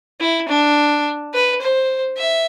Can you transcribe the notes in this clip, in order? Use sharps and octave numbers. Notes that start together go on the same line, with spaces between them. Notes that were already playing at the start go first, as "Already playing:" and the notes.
E4
D4
B4
C5
E5